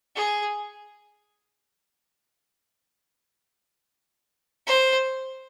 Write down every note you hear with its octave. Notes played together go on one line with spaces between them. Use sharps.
G#4
C5